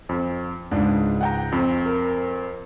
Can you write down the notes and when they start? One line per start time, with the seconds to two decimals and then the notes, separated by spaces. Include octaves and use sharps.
0.09 F2
0.71 C#2 G#2 D4
1.21 F#5 G5 A#5
1.52 F2 C4
1.86 A#4